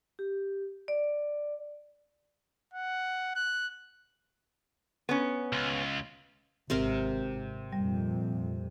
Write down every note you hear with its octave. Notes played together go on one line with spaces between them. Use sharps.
G4
D5
F#5
F#6
B3 C#4
C#2
G#1 C3 C4 A#4
F2 A#2 G3